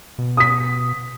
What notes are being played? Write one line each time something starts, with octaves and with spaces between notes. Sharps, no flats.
B2
D#6 B6